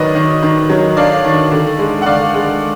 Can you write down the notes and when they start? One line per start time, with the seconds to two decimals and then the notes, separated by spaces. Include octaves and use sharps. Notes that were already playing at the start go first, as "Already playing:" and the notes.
Already playing: D#3 F#3 A#4 B4 D5 D#5
0.15 D#3
0.43 D#3
0.70 F#3
0.97 D4 D5 F5
1.25 D#3
1.52 D3
1.79 G#3
2.02 F#5
2.06 D3 D5 F5
2.34 G#3